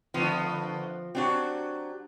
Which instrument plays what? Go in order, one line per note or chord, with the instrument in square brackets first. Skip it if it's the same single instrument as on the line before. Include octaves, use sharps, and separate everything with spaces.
[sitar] D3 A3 B3 [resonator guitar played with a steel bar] F3 C4
[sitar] F#3 G4 [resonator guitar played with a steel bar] C4 D4 F#4